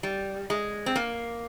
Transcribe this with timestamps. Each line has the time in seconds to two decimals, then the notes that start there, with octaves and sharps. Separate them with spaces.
0.03 G3
0.50 G#3
0.86 C4
0.96 A#3